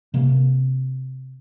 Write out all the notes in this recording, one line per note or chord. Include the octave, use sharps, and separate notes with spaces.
C3 A#3